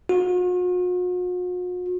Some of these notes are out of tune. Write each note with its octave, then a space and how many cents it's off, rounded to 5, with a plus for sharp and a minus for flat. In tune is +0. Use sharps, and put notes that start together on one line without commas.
F#4 -45